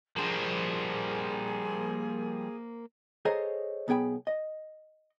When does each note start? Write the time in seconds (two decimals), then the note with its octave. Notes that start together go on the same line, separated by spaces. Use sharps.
0.16 F3 G3 A#3 G#4 C5
3.25 G#4 A4 C5 C#5 D#5 A#5
3.88 B1 B3 G#4 G5 B5
4.27 D#5